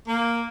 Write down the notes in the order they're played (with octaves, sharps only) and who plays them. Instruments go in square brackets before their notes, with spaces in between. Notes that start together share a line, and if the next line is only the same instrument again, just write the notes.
[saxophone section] A#3